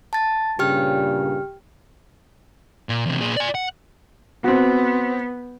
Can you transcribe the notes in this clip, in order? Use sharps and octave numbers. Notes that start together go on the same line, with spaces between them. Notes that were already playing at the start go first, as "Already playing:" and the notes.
A5 A6
G2 A#2 C#3 G4 G5 F6
A#2
E2 C3
A#2 G#4
D5 G#5
F#5
B3 C4 F#4